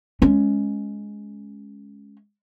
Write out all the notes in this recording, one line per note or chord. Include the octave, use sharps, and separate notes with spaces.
G#3 C#4